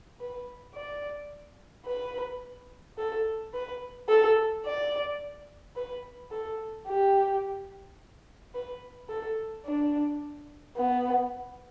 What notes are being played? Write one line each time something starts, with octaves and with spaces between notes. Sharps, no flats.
B4
D5
B4
A4
B4
A4
D5
B4
A4
G4
B4
A4
D4
B3